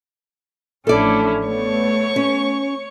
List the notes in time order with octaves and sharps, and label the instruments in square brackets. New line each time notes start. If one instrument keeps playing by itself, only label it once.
[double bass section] A1 F3 A3 [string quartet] C#4 D4 E4 [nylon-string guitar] A4 D5
[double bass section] A3 B3 [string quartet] C#5 C#6
[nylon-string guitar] C#4